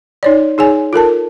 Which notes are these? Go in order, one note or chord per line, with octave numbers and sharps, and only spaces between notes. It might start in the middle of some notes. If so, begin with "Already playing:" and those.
D#4 C#5 D5
D#4 G#4 C#5 G#5
F4 A4 A#4 A5